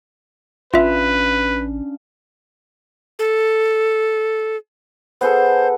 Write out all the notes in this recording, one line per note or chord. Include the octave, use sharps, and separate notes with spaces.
A1 C#4 D4 F4 B4 E5 F5
A4
B3 G#4 A4 C5